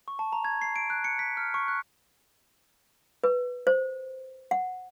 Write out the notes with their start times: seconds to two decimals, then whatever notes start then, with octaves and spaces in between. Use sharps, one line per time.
0.08 C#6
0.19 A5
0.33 A#5
0.45 G#6
0.62 C7
0.76 D7
0.90 F#6
1.04 C#7
1.19 B6
1.37 F6
1.54 C#6
1.68 F#6
3.24 B4
3.67 C5
4.51 F#5